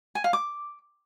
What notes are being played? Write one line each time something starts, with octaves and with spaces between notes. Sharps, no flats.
G#5
F5
D6